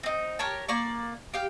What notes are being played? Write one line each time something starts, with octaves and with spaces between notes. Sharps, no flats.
C4 D#4
G4 A#4 C#5 A5
A#3 D5 C#6
G4 F5 G5